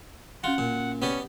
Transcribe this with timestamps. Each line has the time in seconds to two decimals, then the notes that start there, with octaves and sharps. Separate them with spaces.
0.44 C#4 F4 F#4 F#5 C6
0.58 A#2
1.02 B3 C#4 G4 D5